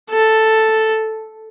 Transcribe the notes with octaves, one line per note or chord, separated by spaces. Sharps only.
A4